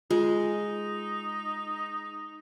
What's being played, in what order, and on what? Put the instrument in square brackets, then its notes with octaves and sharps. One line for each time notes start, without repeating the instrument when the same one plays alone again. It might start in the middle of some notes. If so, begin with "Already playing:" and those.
[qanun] G#3 [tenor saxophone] D#4 [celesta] F4